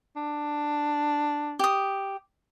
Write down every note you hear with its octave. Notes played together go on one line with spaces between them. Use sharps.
D4
G4 D#6